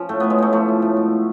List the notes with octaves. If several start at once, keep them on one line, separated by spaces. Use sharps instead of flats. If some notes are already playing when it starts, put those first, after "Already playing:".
Already playing: F3 C#4 F4
A2 A3
A2 B3
G#3
A2 A3
F3 A3
F3
A2
G#2